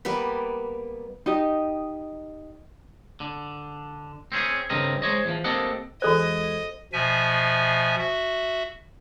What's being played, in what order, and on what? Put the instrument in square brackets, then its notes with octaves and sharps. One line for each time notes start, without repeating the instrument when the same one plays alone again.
[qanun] G3 A#3 B3 B4
[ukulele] D#4 G4 D#5
[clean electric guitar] D3
C4 C#4 E4 G#4
G2 C#3 C4 A#4 D#5
G#3 C5 C#5 D#5
E2 E3 F3
A#3 C4 G4 A4 D#5 F#5
[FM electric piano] E2 G#3 G#6 [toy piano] F#4 A4 C5 [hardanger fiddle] D#5
[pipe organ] B2 F3 E5 G#5
F#4 E5